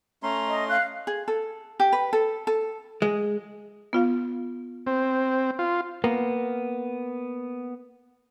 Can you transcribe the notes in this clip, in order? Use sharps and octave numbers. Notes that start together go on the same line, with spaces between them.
A3 C#4 A#5 C6
D#5
F5 F#6
G#4
A4
G4
B4
A4
A4
G#3
B3 F4 F5
C4
F4
A#3 B3